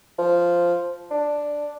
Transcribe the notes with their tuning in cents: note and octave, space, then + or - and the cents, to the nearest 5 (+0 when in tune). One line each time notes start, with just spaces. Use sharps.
F3 -5
D4 +0